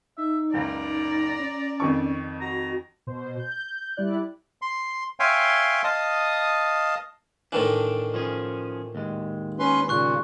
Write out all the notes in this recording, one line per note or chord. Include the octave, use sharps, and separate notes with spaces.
D#4 E5
F#1 C#2 D5 A#5
C#4
F2 D#3 C#6
F#4 A#5
B2 C5
G6
G3 E4 D5 F#6
C6
C#5 E5 F5 G5 G#5 C6
D#5 F5 A5 D#6
A2 D#3 E3 D4
F3 C#4 G#4
D#2 G#3
C#4 B4 C6
A#2 C#3 C6 C#6 F#6